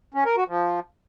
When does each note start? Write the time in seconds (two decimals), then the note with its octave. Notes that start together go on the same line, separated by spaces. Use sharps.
0.14 C#4
0.25 A#4
0.37 F#4
0.48 F3